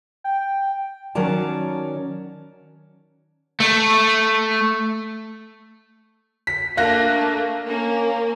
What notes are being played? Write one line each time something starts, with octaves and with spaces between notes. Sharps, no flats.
G5
D#3 F#3 C#4 A#4 D5 A5
A3
B6
A3 A#3 D4 F5 F#6 A#6
A#3 C#4